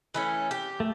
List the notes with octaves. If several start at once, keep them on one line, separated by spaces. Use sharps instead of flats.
E3 A3 C#4
G4
A3